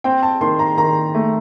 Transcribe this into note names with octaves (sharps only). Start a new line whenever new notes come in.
C4 G5
A5
D#3 C6
A#5
D#3 A#5
A3